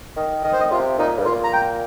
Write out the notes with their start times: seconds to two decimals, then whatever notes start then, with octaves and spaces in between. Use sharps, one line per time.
0.17 D#3
0.44 D#3 D#5
0.53 C5
0.60 D#5
0.71 C3 F4
0.98 A#2 D#4
1.19 G2
1.25 A#2 F4
1.44 A#5
1.53 G5